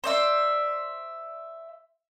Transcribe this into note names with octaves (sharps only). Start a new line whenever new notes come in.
C5 D5 E5